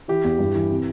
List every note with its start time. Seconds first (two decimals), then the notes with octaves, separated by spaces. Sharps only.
0.08 E3 E4 G4
0.24 E2
0.39 G2
0.55 E3
0.70 C3